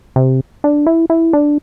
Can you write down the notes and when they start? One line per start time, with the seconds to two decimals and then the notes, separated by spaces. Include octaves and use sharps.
0.16 C3
0.64 D4
0.87 E4
1.10 E4
1.33 D4